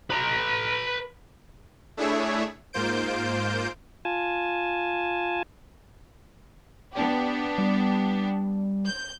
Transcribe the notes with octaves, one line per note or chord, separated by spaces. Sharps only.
B4 A#5
A3 D4 E4 G#4 C#5 E5
G#2 A#3 F4 C5 G6 D7
F4 G#5 A5
B3 D4 G4
G3
G6